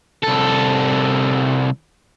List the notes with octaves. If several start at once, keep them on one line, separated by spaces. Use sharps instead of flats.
C2 A4